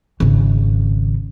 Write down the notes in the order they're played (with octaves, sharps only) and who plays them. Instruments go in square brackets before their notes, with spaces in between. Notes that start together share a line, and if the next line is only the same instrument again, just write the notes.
[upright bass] G#1 C#3